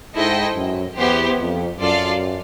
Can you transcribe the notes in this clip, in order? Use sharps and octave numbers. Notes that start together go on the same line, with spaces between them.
G#2 E4 A4 C5 D#5 G5
F#2
E2 B3 E4 G4 C5
F2
F#2 F4 A4 D5 F5